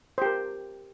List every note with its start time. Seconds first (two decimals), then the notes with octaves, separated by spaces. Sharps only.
0.18 C5
0.22 G4
0.25 A#4